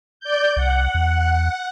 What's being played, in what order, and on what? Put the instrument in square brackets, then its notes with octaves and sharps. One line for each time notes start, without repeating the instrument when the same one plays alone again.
[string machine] D5 G6
[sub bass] C2 [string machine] F#5
[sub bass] E2